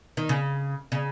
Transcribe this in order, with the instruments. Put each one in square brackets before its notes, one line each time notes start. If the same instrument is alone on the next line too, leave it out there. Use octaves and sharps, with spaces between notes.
[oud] D#3
C#3
C#3